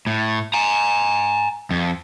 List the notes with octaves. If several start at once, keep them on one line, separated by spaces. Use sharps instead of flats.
A2
G#5 A#5
F2